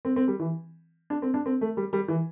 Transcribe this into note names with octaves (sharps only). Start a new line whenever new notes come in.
C4
C4
G3
E3
D4
C4
D4
C4
A3
G3
G3
E3